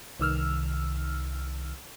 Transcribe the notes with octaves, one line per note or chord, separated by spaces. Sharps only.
C2 D#3 E6 F6